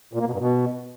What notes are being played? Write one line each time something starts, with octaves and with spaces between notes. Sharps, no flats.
A#2
A#3
B2
G2
B2